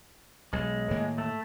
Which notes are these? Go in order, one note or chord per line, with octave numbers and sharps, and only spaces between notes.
B1 G#3
A2 D#3 A#3
A3